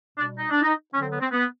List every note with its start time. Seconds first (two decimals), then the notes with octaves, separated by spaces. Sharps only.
0.18 B2 G3 D4
0.37 D#4
0.50 D4
0.62 D#4
0.93 D3 F#3 C#4
1.02 C4
1.12 B3
1.21 C4
1.31 B3